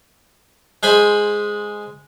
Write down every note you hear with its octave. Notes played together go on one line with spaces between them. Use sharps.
G#3 C5 G#5 B5